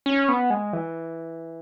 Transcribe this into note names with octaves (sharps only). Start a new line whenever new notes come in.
C#4
B3
G#3
E3